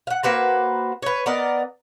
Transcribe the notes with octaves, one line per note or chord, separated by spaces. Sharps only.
F5 F#5
A#3 F#4 B4 C5
B4 C#5
B3 A#4 D5 D#5